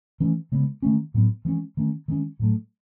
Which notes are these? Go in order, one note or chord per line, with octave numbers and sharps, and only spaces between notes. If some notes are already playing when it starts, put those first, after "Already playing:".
E3 A3 C#4
C#3 G#3 B3
D#3 A3 C#4
A2 F#3 B3
E3 G#3 C#4
D#3 A3 C#4
D#3 G#3 C#4
A2 F#3 A3